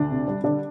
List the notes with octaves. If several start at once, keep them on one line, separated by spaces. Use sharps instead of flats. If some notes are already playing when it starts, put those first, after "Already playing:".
Already playing: D2 D4
C3
G3
D3 D4